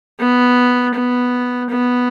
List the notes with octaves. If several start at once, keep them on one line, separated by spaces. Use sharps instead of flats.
B3
B3
B3